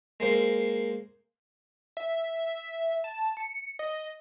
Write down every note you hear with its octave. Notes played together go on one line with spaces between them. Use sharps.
G#3 A#3 C5
E5
A5
C#7
D#5